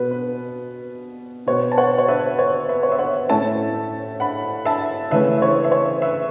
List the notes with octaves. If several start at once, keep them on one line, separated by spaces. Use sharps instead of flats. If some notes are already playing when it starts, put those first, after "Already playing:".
Already playing: B2 B3 B4
B4
B2 B3 C#5
A5
C#5 F#5
C#5
B4 E5
C#5
B4 E5
C#5
E5
C#5 F#5
A2 A3 C#4 E5 A5
F#5 B5
E5 A5
C#3 E3 A3 C#4 B4 E5
E5
C#5
E5
C#5
B4 E5